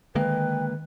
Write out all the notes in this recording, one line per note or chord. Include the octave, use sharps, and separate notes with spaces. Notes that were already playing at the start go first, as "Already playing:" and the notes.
D3 D#3 G#3 A#3 B4 G5